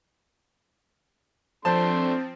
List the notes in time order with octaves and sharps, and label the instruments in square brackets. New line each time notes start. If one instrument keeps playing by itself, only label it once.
[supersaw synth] F3 C4 [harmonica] A3 D4 C6 [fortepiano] C5 A5